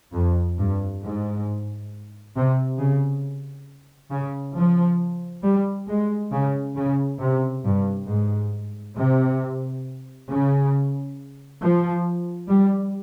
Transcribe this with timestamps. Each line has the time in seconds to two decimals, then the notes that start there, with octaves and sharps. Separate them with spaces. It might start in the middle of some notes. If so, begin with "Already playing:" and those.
0.13 F2
0.57 G2
1.02 G#2
2.34 C3
2.78 C#3
4.10 C#3
4.54 F3
5.42 G3
5.87 G#3
6.31 C#3
6.75 C#3
7.19 C3
7.63 G2
8.07 G#2
8.96 C3
10.27 C#3
11.60 F3
12.48 G3